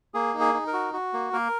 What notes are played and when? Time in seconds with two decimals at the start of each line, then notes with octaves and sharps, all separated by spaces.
0.14 A#3 G#4
0.34 D#4
0.40 G#4
0.54 D#4
0.67 A#4
0.73 F#4
0.93 F#4
1.13 A#3
1.33 A#3 A#4